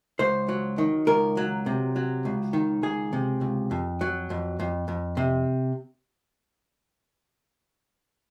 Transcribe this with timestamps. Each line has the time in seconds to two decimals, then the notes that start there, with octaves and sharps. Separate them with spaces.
0.19 C#2 C5
0.49 F#3
0.78 D#3
1.07 C#2 A#4
1.37 F#3
1.66 C3
1.96 F#3
2.25 C#2
2.53 D#3
2.83 C#2 G#4
3.13 C3
3.41 C#2
3.71 F2
4.01 F#3
4.30 F2
4.60 F2
4.88 F2
5.17 C3